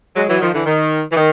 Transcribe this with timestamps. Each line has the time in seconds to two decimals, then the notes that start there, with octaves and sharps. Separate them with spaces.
0.16 F#3 G#3
0.29 E3 F#3
0.41 D#3 F3
0.54 D3 E3
0.66 D#3
1.12 E3
1.17 D#3